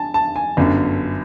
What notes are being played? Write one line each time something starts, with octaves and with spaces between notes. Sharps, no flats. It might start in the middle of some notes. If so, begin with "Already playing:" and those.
Already playing: G#5 A5
A5
G#5
G1 F#2 D3